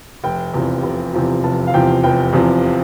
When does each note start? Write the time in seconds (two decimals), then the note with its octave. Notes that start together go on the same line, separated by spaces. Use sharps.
0.24 F1 G5
0.54 E2 C3 F3
0.83 F1
1.13 E2 C3 F3
1.43 F1 A5
1.67 F5
1.74 E2 C3 F3 G5
2.04 F1 G5
2.33 E2 C3 F3